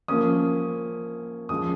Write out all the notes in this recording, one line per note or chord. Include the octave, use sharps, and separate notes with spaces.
F3 A#3 C#4 D#6
F3 G#3 C#4 D#6